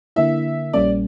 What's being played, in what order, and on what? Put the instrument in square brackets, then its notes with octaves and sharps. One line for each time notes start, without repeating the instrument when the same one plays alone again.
[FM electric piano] D3 A#3 E4 [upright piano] E5
[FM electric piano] A#1 A#2 G3 A#3 C#4 [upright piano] D5